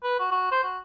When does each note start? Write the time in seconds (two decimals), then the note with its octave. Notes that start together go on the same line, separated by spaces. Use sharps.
0.04 B4
0.20 F#4
0.31 F#4
0.52 C5
0.64 F#4